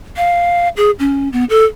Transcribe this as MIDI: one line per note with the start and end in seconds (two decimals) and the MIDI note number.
0.17 0.69 77
0.77 0.91 68
0.99 1.29 61
1.33 1.44 59
1.50 1.65 69